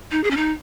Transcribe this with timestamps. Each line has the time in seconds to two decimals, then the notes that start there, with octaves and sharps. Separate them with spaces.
0.12 D#4
0.24 G#4
0.31 C#4
0.37 D#4